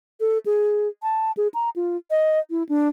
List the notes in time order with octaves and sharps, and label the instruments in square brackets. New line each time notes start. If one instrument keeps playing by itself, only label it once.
[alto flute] A4
G#4
A5
G#4
A#5
F4
D#5
E4
D4